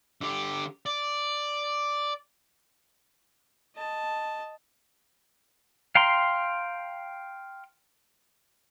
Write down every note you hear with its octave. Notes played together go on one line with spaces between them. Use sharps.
D3 G4
D5
D#5 A5
F5 G5 A#5 C6